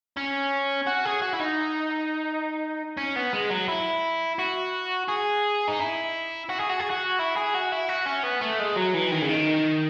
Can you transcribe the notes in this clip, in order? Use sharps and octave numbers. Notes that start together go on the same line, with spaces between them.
C#4
F#4
G#4
F#4
E4
D#4
C#4
B3
G#3
F#3
E4
F#4
G#4
D#4
E4
F#4
G#4
F#4
G#4
F#4
E4
G#4
F#4
E4
F#4
C#4
B3
A3
G#3
F#3
E3
D#3
C#3
D#3